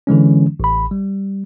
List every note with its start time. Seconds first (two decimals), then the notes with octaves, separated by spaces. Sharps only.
0.07 D3 E3 G#3 C#4
0.60 A1 B5
0.91 G3